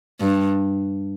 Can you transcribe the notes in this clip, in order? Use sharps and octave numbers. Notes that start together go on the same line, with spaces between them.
G2